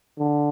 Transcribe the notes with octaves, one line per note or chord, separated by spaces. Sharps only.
D3